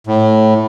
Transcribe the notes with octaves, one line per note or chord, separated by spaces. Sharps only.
A2